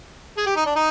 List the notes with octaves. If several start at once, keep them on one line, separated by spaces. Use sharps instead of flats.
G#4
G4
D#4
D4
D#4